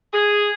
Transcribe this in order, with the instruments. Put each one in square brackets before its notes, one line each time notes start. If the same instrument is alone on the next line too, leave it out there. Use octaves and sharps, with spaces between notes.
[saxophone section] G#4